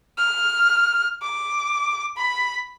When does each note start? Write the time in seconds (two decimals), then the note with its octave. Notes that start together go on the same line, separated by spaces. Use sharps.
0.17 F6
1.22 D6
2.17 B5